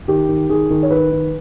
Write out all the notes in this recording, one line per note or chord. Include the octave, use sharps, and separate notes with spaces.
D#3 G4
D#3
D#3 G#4
D#3
C#5
D#3 B4
D#3